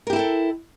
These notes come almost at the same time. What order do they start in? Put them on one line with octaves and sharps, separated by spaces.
A#4 G4 E4 G5 A4